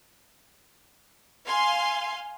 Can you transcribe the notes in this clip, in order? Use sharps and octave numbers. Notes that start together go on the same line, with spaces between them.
F5 G#5 C6